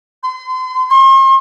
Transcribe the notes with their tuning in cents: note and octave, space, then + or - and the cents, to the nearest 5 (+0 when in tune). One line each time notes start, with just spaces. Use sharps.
C6 -30
C6 +40